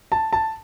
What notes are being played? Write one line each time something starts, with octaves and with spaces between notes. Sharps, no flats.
A5
A5